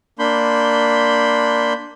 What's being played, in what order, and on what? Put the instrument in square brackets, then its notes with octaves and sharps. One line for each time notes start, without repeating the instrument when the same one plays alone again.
[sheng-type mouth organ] A#3 D4 B5 C6 G6